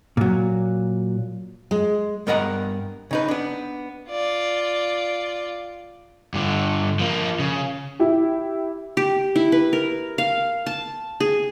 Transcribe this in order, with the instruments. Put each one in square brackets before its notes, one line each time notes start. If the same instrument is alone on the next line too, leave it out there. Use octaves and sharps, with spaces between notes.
[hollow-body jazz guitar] A#2 F#3
[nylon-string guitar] G#3
[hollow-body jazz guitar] G2 B3 A#4 D#5 F#5 A#5
C#3 D#4 B4
B3 D4
[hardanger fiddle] F4 D5
[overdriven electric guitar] G2 D3
F3 A#3
C#3
[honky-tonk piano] E4 G4
[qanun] G4
E4
B4
A#4
F5
A5
G#4